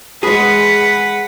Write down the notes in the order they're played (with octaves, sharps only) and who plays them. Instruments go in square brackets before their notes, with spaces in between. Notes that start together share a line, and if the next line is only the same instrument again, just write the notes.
[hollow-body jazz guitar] G#3 G#4 [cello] B4 F#5